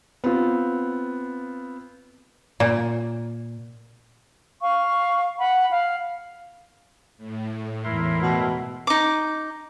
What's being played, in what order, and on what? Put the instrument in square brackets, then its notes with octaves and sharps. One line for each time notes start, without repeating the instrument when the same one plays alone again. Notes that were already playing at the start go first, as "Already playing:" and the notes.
[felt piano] B3 C4 F4
[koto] A#2
[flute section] F5 C#6
F#5 B5
F5
[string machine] A2
[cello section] E2 G#2 E3 [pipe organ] E4 A#4 C6
[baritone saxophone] B2
[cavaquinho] D#4 D6